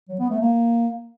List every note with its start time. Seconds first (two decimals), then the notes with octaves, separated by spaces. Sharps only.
0.09 F#3
0.20 B3
0.30 A3
0.41 A#3